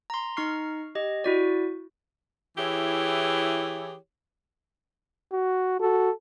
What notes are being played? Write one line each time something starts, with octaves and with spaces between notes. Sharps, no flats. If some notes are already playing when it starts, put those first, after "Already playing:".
A#5 C6
D#4 A#5 C#6 F6 C7
G4 D#5
E4 F#4 D5
E3 E4 G4 G#4 C#5
F#4
F#4 A4